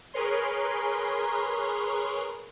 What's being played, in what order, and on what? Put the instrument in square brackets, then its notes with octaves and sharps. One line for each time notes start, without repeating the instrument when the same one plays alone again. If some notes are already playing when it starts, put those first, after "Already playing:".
[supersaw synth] G#4 A#4 B4 C#5 C6